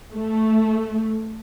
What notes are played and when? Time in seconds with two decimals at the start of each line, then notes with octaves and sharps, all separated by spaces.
0.15 A3